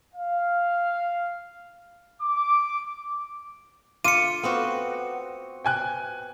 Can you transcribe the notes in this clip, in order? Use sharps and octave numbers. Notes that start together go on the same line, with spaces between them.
F5
D6
F4 D6 C#7 D#7
B3 C4 F#4
G5 G#5 F#6